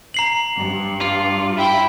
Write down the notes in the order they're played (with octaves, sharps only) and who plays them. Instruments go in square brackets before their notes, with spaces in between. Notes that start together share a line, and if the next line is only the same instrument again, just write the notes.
[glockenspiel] A#5 C7 F#7
[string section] G2
[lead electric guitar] F4
[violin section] E4 G5 B5